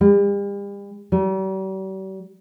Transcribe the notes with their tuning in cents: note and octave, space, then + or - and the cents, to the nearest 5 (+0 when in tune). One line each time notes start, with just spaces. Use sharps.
G3 +40
G3 -45